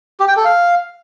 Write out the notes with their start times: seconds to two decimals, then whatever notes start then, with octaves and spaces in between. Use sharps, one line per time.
0.20 G4
0.28 G5
0.36 A4
0.45 F5